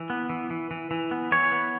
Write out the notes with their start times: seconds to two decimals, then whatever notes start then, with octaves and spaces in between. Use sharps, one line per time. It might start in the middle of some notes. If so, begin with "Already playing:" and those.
Already playing: E3
0.10 B3
0.30 E3
0.50 E3
0.71 E3
0.91 E3
1.11 B3
1.32 E3 C#5
1.52 B3